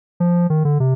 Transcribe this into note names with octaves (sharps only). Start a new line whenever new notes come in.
F3
D#3
D3
C3